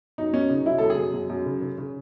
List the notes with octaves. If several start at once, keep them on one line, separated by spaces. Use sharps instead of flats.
F#2 D#4
F#2 C#4
C#3 D#4
F#2 E4
F#2 A4
G#4
F#2
F#2
F#2
C#3
C#3
C#3